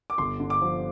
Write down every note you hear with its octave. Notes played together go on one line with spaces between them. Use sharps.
D6
G1 C6
D3
D6
F3